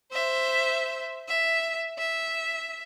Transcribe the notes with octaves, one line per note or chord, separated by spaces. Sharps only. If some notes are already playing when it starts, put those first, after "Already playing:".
C5 E5
E5
E5